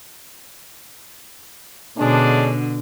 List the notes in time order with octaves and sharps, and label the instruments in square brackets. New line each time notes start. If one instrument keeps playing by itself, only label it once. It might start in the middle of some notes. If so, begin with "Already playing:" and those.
[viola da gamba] B2 D3 [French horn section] G#3 C#4 D4